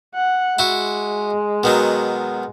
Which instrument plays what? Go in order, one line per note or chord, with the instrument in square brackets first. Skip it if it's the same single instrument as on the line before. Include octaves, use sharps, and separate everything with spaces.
[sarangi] F#5
[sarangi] G#3 [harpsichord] E4 F#4
[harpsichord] B2 D#3 F#3